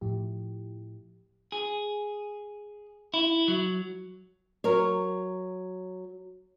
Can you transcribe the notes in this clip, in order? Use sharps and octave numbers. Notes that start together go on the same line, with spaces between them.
A2 F3 E4 G4
G#4
E4
F#3
F#3 A#4 C#5